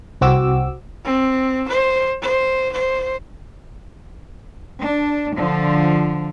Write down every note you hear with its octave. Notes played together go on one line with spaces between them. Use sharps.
C2 C4 F#4 D6 E6
C4
C5
C5
C5
D4
D3 F3